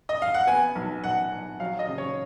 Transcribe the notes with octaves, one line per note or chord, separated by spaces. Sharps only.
D#5
F5
F#5
B3 G#5
B1
B1 F#5
B1
F#3 F5
D#5
C#3
C#5